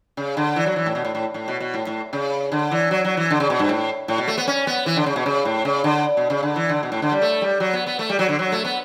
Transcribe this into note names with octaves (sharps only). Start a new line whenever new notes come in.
C#3
D3
E3
F#3
E3
A2
B2
A2
A2
A2
B2
B2
A2
A2
C#3
D3
E3
F#3
F#3
E3
D3
C#3
B2
G2
A2
A2
B2
A3
B3
C#4
B3
E3
D3
C#3
B2
C#3
A2
C#3
D3
B2
C#3
D3
E3
D3
B2
A2
D3
G3
A3
G3
F#3
B3
B3
A3
G3
F#3
D3
F#3
A3
B3